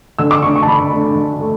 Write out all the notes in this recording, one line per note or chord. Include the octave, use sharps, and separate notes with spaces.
D3 E6
D6
A3 D4 C#6
C#6
A5
D3 B5
A3 D4
D3
A3